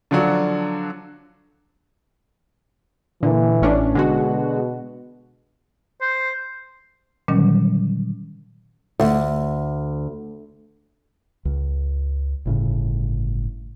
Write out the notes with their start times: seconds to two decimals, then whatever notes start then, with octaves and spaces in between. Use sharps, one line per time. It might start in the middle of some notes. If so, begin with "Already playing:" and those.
0.11 D3 F3 F#3 D4 F#4
3.23 A#2 D3 E3
3.62 A1 C#4 D4
3.95 B2 D3 G#3 F#4
6.01 C5
7.28 A#2 D3 D#3 F#3 G3 C#4
9.00 D2
11.45 C#2
12.45 G1 A2 C#3